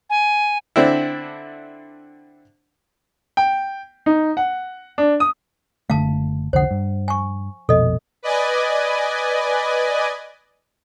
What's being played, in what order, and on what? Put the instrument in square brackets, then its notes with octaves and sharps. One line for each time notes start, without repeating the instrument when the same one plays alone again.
[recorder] G#5
[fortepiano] D3 C4 D4 E4
[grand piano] G5
D#4
F#5
D4
D#6
[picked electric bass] F#1 D3 A3 [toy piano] F5 A5
[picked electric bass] C2 F2 D3 [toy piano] C5 F#5
[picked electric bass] G2
[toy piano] G#5 C#6
[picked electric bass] A#1 F2 B2 [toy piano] A4 D#5
[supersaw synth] B4 D5 D#5 G#5